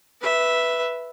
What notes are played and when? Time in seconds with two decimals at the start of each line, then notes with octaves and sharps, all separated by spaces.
0.21 B4 E5